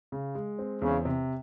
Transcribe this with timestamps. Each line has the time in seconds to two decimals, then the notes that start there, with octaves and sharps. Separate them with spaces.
0.12 C#3
0.35 G#3
0.59 C4
0.82 E2 C#3
1.05 C3